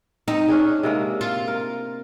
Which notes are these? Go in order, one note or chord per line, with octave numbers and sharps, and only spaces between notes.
C4 D#4
C#4 D4 G#4
C3 G#3 A#3
F4
A#4